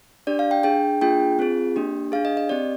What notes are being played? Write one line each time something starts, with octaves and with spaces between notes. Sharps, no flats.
D4 G4 D5
F5
G5
D4 G#4 G5
A#3 D4 F4 G#4 G5
C4 F4 G#4
A#3 D4 G4
D4 G#4 F5
D#5
D#5
C4 G4 D5